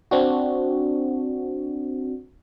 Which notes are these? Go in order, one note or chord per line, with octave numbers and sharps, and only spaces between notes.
C4 D4 F#4